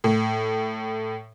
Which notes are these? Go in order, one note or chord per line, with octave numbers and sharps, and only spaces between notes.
A2